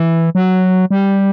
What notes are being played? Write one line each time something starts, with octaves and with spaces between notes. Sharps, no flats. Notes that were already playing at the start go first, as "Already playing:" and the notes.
Already playing: E3
F#3
G3